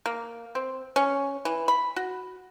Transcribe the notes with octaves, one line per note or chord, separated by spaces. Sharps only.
A#3
C4
C#4
E3
B5
F#4